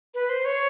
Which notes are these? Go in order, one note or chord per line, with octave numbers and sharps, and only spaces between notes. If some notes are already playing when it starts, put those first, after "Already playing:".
B4
C5
C#5